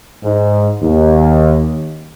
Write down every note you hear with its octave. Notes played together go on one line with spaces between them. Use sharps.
G#2
D#2